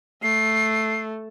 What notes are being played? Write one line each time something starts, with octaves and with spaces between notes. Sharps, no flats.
A3 C7